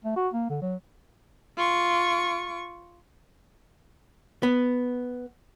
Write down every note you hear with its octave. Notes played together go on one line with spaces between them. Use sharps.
A3
F#4
A#3
D3
F#3
F4 C#6
B3